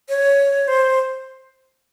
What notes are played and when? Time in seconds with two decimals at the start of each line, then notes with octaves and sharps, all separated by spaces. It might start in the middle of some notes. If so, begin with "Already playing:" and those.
0.09 C#5
0.68 C5